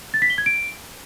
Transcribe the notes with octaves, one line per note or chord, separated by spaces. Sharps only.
A6
B6
G7
G#6
D7